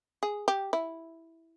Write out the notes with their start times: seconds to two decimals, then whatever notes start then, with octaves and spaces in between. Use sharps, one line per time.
0.23 G#4
0.48 G4
0.73 E4